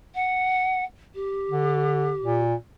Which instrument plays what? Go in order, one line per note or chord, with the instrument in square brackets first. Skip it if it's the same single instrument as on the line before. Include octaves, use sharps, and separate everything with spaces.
[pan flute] F#5
G4
[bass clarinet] D3
A#2